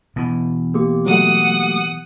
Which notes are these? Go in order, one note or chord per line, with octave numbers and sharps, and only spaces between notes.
B2 E3
A#3 G4
F#3 G3 A3 F#5 D#6